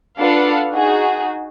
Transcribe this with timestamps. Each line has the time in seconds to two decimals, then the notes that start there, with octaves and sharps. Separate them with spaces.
0.20 D4 F4 A4 B4 F5 F#5
0.73 D#4 F#4 G#4